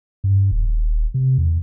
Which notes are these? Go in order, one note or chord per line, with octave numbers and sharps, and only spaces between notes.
G2
D#1
C3
E2